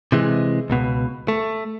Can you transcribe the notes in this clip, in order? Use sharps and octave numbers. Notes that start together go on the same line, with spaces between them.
C3 E3 G#3
C#2 B2
A3